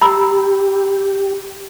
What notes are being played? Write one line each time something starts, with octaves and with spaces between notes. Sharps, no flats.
G4 A#5 B5 E6